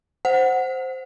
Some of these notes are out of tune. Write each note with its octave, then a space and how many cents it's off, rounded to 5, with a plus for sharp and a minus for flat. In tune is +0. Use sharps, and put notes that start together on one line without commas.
C5 +0 F#5 +0